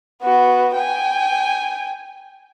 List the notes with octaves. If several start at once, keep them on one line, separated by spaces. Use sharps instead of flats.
B3 F#4
G5 G#5